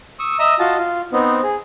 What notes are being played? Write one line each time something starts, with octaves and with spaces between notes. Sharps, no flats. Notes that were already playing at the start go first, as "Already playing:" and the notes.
C#6 D#6 E6
D#5 E5 A#5 D#6 E6
F4 F#4 D#5 A5
F4
B3 C4 D#4
G#4